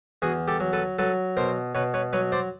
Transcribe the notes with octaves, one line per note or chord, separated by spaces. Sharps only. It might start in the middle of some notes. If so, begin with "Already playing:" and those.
E2 F#4 G#4
G4 A4
F#3
A4 B4
F#3 A4 B4
B2 A#4 C5
B2 B4 C#5
B4 C#5
F#3 B4 C#5
C5 D5